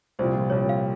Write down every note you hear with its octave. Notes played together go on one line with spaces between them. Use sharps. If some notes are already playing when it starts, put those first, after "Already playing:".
C2 A#2 F3 C5
C2 A#2 F3 C#5
F5